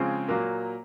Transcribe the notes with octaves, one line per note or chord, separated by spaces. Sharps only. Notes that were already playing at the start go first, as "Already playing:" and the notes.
Already playing: C#3 F3 G#3 C4
A#2 F#3 A#3